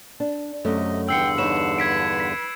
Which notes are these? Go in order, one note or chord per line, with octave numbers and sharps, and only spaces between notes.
D4
F#2 C3 A3 D#5
E2 G2 D3 G5 E6 C7 C#7
D#4 B4 C#5 E7
B4 G#6 B6 D7
B6